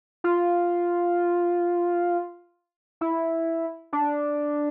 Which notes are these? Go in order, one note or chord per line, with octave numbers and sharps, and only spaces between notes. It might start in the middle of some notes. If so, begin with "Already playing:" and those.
F4
E4
D4